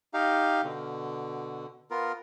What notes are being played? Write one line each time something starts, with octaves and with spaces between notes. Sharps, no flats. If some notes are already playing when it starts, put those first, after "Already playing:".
D#4 G4 F5
B2 D3
B3 F4 A#4